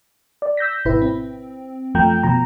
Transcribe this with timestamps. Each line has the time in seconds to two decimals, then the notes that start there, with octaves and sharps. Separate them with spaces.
0.42 D5
0.57 E6 G6 A#6 B6
0.85 G#1 B2 E4 B4
1.02 C4
1.95 F#2 F3 A3 G5 A#5 G6
2.23 B2 F3 A#5